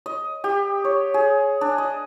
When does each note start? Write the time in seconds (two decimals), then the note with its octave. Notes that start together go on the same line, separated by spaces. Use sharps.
0.06 D#5
0.44 G4
0.85 C#5
1.14 G#4
1.61 D4
1.78 D#5